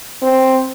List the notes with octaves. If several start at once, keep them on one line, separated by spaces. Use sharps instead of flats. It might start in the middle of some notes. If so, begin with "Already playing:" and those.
C4